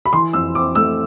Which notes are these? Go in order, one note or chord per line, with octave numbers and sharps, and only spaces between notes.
B5
E3 C6
F2 E6
C4 D6
A3 E6